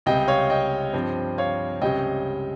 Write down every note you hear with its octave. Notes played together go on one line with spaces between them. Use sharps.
C#2 C3 G3 D#5 G5
C#5 F5
D#5 G5
G2 F3 C4
C#5 F5
C#2 C3 G3 C#4 D#5 G5